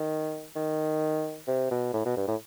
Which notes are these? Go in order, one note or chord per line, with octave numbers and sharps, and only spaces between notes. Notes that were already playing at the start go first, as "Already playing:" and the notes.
Already playing: D#3
D#3
C3
B2
A2
B2
G2
A2